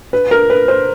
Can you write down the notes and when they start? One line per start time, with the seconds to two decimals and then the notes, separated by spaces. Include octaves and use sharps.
0.13 B4
0.31 A#4
0.50 B4
0.68 C5